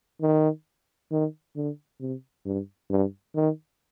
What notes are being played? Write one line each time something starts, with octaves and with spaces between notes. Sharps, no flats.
D#3
D#3
D3
C3
G2
G2
D#3